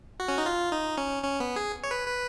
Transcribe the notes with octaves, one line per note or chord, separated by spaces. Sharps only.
F#4
C#4
D#4
F4
D#4
C#4
C#4
B3
G#4
C#5
B4
B4